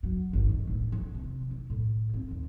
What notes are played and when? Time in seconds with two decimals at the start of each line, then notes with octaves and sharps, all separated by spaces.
0.03 F#3
0.33 G#1
0.49 D#3
0.67 A2
0.92 E3
1.14 C3
1.50 E3
1.70 A2
2.14 C4
2.31 D#2